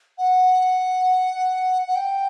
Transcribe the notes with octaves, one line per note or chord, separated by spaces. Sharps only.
F#5
F#5
G5